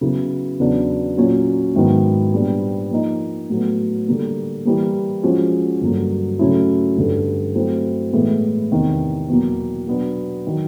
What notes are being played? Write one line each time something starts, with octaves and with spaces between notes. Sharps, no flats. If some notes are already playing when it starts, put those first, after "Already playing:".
C#3 F#3 B3 E4
E2 C#3 F#3 B3 D4
A#2 F#3 A#3 C#4 F4
G#2 D#3 F#3 B3 E4
A#2 G3 B3 D4
F3 A#3 D#4
A2 F#3 B3
D3 G3 A#3
E3 G3 A#3
F3 G#3 C#4 F#4
G2 D3 F#3 A#3
C#3 F#3 A3 C#4 E4
G2 D3 G3
F#3 A3 C4 E4
A2 E3 G#3 B3 E4
E2 C3 D#3
E2 B2 F#3 A#3
B2 F#3 B3 D4
D#3 F#3